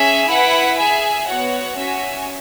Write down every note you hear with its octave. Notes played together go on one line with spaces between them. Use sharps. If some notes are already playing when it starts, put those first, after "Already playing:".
Already playing: C#4 G#4 E5 G#5
E4 B4 F#5
G#4 E5 G#5
B3 F#4 C#5 F#5
C#4 F#4 C#5 E5 G#5